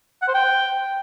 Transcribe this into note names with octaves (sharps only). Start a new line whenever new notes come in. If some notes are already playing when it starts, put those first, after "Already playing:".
F#5
C5
G5